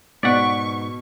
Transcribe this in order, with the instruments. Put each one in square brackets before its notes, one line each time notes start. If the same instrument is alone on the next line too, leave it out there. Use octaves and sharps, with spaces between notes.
[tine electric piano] G#2 [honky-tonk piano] B2 B6 D7 [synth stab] D5 F#5 [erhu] C#6